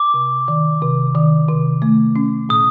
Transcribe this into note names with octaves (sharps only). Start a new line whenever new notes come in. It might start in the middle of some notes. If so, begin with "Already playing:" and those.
Already playing: D6
C3
D#3
C3
D#3
C3
A3
C#4
A#2 D#6